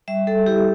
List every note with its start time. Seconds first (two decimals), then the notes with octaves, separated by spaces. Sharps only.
0.08 G3 E5
0.27 G3 A4
0.46 E4 G4